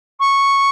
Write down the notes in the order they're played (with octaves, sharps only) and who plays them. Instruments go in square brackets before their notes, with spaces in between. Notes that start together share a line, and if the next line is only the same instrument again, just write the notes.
[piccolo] C#6